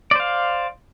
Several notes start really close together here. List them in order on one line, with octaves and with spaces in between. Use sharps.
D5 C5 F5